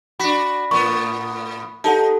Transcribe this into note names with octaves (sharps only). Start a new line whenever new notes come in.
D4 F#4 B5 B6
A2 B3 C#6
D#4 G4 A4 F#5 A5